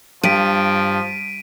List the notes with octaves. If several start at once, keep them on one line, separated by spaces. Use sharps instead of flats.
G2 F3 B6 D7 D#7